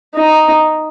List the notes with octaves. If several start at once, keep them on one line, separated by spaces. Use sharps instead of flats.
D#4